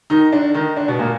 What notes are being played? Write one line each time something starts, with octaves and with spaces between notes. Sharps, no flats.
D#3 D#4
D3 D4
D#3 D#4
D3 D4
B2 B3
A#2 A#3